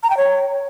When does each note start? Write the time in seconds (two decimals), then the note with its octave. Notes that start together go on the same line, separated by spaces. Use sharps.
0.03 A#5
0.10 G5
0.17 C#5